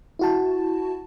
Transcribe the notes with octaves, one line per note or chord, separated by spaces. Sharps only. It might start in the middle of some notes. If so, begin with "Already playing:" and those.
E4 F#4 A5